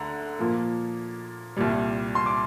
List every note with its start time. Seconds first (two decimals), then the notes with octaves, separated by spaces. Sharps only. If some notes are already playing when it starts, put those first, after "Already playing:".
Already playing: D2 D3 A#5
0.39 A#2 F3 A#3
1.57 C2 A#2 G3
2.15 C6
2.26 D6